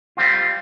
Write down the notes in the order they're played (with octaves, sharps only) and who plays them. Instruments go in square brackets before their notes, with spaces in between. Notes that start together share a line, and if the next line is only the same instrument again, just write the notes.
[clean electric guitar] G3 C4 F4